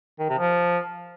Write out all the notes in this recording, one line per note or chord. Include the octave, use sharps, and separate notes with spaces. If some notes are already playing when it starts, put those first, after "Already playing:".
D#3
C3
F3